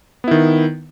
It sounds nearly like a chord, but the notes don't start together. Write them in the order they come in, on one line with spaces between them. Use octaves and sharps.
B3 E4 D#3